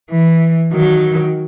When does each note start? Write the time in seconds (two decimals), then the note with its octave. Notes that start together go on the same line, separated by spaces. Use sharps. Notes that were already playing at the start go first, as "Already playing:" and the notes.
0.10 E3
0.73 D#3 F#3